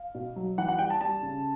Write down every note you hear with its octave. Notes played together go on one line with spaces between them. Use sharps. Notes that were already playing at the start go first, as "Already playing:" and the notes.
Already playing: F5
B2
F#3
E3 F#5
F#5
G3 G5
A5
G3 A5
C#3